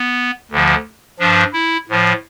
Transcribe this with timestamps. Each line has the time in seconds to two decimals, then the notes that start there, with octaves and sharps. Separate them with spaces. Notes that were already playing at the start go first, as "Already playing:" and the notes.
Already playing: B3
0.51 D2 D3 F3
1.19 G2 F3 D4
1.53 E4
1.89 A2 F3